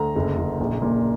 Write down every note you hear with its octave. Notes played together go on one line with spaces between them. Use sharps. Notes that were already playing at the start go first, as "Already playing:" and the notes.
Already playing: D2 A#5
F#1
F#1
A#1
A#2